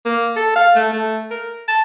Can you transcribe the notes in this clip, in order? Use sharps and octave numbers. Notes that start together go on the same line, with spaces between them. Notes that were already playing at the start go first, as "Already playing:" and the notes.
A#3
A4
F5
A3
A3
A#4
A5